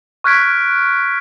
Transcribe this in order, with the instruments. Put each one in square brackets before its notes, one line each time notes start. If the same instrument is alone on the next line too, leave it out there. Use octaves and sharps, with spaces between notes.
[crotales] C#6 F6 F#6 G#6 B6 D7